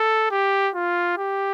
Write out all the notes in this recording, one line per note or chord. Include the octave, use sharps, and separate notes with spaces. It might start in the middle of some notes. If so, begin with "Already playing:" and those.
Already playing: A4
G4
F4
G4